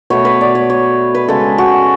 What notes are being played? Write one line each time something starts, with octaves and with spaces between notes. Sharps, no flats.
B2 A3 C#5
B4
D5
C#5
C#5
B4
C#3 G#3 A4
F#4